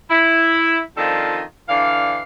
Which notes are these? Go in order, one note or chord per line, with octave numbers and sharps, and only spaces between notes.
E4
D#3 F3 C4 D4 F4 A4
D3 E3 D5 F5